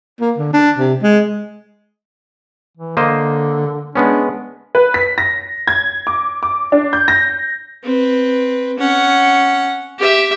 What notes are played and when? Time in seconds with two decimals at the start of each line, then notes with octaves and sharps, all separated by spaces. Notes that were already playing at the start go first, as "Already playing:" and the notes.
0.21 A#3
0.38 D3
0.53 D4
0.78 C3
1.03 G#3
2.77 E3
2.97 D3 A#3 C5 D#5
3.95 G#3 B3 C#4 D4
4.75 B4
4.94 B6
5.18 A#6
5.68 G#6
6.07 D6
6.43 D6
6.72 D4
6.93 G6
7.08 A#6
7.84 C4 B4
8.79 C#4 F#5
9.99 G4 E5